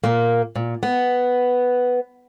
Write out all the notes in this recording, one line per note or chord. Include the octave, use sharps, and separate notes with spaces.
A#2 A#3
A#2
B3